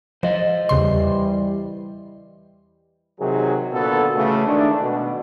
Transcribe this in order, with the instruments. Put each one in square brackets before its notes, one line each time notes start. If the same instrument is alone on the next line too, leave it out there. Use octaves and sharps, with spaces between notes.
[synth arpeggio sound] F3 [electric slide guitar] C5 D#5
[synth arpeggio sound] E2 C#3 C6 [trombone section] E3 G3
[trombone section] C3 D#3 F#3 G#4
A#2 D3 B3 F#4 A4
C#3 E3 A3
D#3 G#3 A3 D4
B2